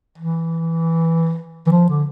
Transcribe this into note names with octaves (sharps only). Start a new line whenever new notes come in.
E3
E3
F3
D3